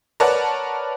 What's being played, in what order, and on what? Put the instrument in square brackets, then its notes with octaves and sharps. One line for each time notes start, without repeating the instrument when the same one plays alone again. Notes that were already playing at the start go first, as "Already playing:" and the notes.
[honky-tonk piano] A#4 B4 C#5 D5 F#5 A5